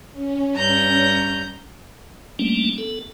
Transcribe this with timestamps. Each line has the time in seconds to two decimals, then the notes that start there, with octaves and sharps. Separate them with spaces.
0.12 C#4
0.55 G2 A#5 G6
2.39 G3 A3 A#3 C#4 D4
2.78 B3 A4